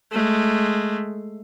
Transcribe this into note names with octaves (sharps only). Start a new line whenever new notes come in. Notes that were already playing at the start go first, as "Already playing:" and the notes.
G#3 A3